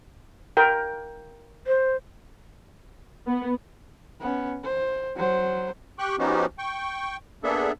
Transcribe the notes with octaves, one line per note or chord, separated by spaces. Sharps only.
A#4 G5
C5
B3
B3 C#4
C5
F#3 C5
G4 G5 C#6 F#6
F3 B3 C#4 D#4 F#4 G4
G5 C#6
A#3 B3 D4 G#4 A4 E5